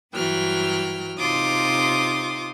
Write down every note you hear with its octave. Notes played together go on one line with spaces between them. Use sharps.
G2 E3 F#3 G5 F6
C3 D#4 F4 C6 D6 D#6